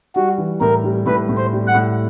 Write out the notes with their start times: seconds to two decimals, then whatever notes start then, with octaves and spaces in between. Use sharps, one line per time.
0.15 G3 F#4
0.38 E3
0.60 A2 A#4
0.84 G3
1.06 A2 B4
1.29 A2
1.37 C5
1.53 G3
1.68 F#5
1.74 A2